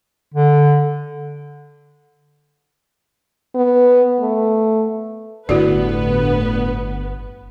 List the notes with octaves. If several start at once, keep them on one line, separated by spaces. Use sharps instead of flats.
D3
B3
A3
G1 A2 D3 B3 E4 F#4 B4 D5